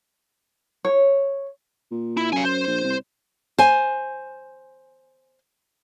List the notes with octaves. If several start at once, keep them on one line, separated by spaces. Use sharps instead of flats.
C#5
A#2
E4
F#2 F5 G#5
C5
A#1
C2
C5 G#5